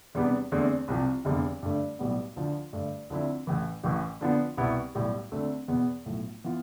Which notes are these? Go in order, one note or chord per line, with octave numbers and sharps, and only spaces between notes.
E2 C3 G3 B3 D4
E2 D3 A3 C4
C2 C3 F3
F1 E2 D3 G3
G2 D3 A3
B1 A2 G3 B3
D2 D3 F3
G2 D3 A3
D2 D3 F3 C4 E4
A1 A2 E3
A1 A2 E3
D3 F3 B3
C2 B2 B3 E4
B1 A2 G3
D2 D3 A3 C4
E2 B2 B3
B1 A2 F3 A3
E3 B3 F4